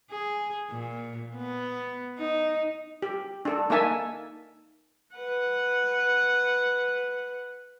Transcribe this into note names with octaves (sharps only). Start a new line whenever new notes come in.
G#4
A#2
B3
D#4
G4
D4 A4
A#3 D#4 A4 E5 G#5 A5
B4 F#5